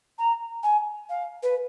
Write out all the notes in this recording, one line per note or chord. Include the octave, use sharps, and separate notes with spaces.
A#5
G#5
F5
B4